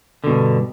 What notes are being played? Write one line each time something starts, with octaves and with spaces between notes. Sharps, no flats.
G2 B2 D3